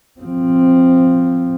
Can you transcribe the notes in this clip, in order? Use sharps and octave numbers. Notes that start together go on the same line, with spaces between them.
F3 C4